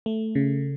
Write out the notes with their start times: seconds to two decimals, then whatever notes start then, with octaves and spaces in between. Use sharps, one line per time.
0.06 A3
0.35 C#3